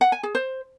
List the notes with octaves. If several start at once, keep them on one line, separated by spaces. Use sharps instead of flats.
F#5
G#5
G#4
C5